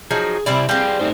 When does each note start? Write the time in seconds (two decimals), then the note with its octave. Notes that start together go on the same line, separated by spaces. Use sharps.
0.11 F3 F#3 D#4 G#4
0.46 C3 G3 C4 E4 D5
0.69 G3 C4 G#4 F5 G5
0.99 A3 D#4 C5